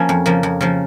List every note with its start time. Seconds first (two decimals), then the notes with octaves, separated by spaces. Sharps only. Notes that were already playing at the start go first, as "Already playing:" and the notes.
Already playing: F3 A#3 C#4 F#4
0.09 F2
0.26 C#3 F3 A#3
0.43 F2
0.61 C#3 F3 A#3